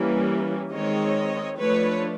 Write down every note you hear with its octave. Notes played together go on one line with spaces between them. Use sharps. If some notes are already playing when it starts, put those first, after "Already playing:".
Already playing: E3 G3 A#3 C#4
D#3 G#3 C4 C#5 D#5
F3 A3 D4 B4 C#5